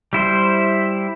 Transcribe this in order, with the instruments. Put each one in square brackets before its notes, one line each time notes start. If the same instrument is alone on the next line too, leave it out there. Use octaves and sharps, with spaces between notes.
[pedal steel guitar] G3 E4 C5